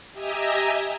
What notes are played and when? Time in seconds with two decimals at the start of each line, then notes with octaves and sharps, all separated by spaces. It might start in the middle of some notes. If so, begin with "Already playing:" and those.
0.13 G4 D#5 E5 G#5 A#5